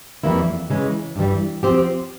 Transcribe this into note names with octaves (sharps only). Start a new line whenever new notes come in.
F2 E3 G3 A#3 E4
C#3 E3 G#3 C#4
G2 E3 G3
F3 C4 G4